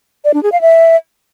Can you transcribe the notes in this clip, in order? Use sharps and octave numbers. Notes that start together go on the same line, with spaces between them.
D5
D4
G#4
F5
E5